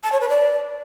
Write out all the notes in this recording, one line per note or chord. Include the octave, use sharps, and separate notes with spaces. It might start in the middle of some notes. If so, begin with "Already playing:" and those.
A5
C#5
B4
D5